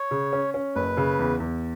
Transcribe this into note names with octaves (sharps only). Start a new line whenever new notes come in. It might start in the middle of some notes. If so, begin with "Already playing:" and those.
Already playing: C#5
C#3
C#4
C#4
F#1 B4
C#3
E2
E2